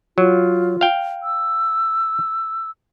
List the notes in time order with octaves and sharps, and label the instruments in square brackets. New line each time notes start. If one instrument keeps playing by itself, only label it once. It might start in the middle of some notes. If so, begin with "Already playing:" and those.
[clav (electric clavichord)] F#3 [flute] F4
[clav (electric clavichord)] F5 G5
[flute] E6